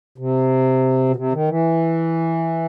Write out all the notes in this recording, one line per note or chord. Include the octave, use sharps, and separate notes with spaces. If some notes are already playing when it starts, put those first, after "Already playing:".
C3
B2
C3
D#3
E3